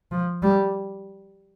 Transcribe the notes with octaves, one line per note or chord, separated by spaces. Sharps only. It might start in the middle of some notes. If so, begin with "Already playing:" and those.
F3
G3